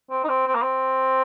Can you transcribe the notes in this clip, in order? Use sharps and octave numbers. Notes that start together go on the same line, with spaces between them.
C4
D#4
C4
C4
A#3
C4